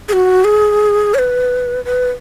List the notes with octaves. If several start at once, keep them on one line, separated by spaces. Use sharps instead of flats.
G#4
F#4
G#4
C#5
B4
B4